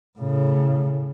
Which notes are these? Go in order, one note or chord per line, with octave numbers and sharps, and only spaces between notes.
A2 C#3